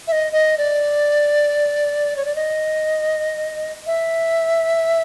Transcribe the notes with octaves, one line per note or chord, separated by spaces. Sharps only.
E5
D#5
D#5
D5
C#5
D5
D#5
E5